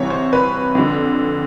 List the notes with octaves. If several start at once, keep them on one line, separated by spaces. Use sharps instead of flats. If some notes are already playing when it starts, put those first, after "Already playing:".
Already playing: C2 C3 E3 C#5
C5
B4
F2 D3